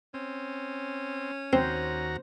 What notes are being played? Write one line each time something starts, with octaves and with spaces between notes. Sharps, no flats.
C4 C#4
D#2 C4 F#4 C5 A#5